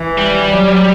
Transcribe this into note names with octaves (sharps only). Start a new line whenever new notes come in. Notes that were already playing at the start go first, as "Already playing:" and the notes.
Already playing: E3
G3
F#3